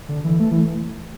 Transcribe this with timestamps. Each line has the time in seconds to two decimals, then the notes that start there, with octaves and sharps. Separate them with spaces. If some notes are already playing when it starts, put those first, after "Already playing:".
0.09 D3
0.24 E3
0.40 A3
0.52 E3